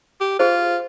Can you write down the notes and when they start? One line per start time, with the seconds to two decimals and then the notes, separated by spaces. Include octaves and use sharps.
0.21 G4
0.39 F4 G#4 C5